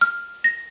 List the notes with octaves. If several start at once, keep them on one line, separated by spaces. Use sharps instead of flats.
F6
A#6